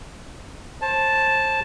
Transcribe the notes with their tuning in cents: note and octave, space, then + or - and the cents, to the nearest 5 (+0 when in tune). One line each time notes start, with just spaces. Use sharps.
C5 +35 A5 -5